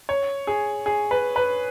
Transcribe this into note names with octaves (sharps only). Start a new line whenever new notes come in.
C#5
G#4
G#4
B4
B4